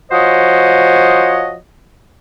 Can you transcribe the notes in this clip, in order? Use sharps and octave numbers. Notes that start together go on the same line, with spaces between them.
F3 F#4 C5 C#5 D#5